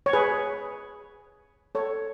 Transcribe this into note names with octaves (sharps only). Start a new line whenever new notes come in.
C#5
G#4 B4
A4 C#5